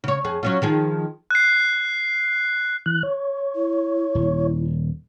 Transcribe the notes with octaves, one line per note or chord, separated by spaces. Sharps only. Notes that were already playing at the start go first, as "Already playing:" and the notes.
C#3 C#5
F2 G#4
F#3 C#4 F4
D#3 F3 G#4
F#6 C7
E3 F#6
C#5
E4
D#1